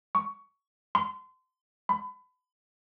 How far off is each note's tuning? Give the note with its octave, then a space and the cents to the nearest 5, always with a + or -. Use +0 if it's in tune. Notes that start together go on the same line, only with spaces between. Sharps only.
C#6 +15
C6 -30
B5 +30